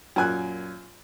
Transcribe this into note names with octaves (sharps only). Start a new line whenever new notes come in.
F#2 A#2 G#5 F#6